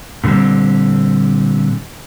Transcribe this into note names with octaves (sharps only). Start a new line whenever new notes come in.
A#2 D3 D#3 G3 C4